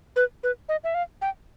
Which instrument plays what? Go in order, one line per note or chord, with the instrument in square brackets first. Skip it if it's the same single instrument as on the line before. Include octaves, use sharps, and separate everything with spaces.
[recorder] B4
B4
D#5
E5
F5
G5